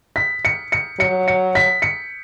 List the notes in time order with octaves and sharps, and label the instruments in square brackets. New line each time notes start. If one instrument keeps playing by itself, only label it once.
[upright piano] B6
C#7
C#7
[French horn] F#3 [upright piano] C#7
[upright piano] C#7
B6
C#7